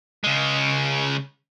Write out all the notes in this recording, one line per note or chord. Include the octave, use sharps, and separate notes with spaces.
C#3 G#3